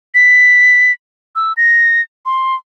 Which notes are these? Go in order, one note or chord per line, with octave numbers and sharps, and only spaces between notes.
B6
E6
A#6
C6